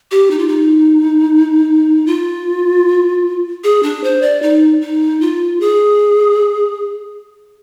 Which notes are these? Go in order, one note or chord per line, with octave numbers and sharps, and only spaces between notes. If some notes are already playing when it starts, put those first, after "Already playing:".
G4
D#4
F4
D#4
F4
G#4
D4
C5
D5
D#4
D#4
F4
G#4